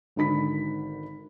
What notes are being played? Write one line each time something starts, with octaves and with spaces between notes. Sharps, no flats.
G#1 D3 D#3 B5 B6